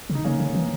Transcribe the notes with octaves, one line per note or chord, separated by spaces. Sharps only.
C#3
D#4
C#3 A#3 C#4
C#3
E3